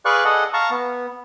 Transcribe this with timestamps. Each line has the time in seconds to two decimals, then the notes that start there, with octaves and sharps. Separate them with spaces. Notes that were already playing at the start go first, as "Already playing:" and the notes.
0.05 G#4 B4 D5 F5 C#6 F#6
0.25 G#4 A4 D#5 F#5
0.54 F5 A5 A#5 C#6
0.70 B3